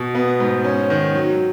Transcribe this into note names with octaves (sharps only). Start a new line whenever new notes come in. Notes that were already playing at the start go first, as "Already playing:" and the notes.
Already playing: B2
B3
G#2
C#4
D#3
F#3